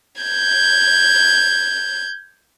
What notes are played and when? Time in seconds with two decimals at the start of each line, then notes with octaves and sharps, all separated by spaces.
0.22 G6 G#6